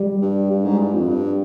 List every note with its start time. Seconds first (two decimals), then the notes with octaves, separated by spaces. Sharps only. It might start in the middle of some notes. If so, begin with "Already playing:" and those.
Already playing: G3
0.22 G2
0.50 G2
0.65 G#2
0.79 G2
0.94 F2
1.08 G2